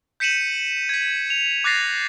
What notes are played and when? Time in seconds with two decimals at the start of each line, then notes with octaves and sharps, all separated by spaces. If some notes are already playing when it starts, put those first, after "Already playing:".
0.20 G6 B6 C#7 D#7 E7 F#7
0.89 G#6 B6
1.30 F7
1.64 D6 F#6 A6 A#6 C7 F7